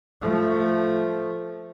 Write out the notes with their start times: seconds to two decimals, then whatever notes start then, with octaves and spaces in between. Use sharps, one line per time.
0.22 F3 A3